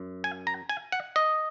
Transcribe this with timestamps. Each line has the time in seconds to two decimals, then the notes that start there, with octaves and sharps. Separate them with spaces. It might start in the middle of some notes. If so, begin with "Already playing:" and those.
Already playing: F#2
0.24 G#5
0.47 A#5
0.69 G#5
0.92 F#5
1.16 D#5